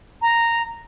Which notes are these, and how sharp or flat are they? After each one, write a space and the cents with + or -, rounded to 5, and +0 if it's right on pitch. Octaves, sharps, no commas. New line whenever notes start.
A#5 -5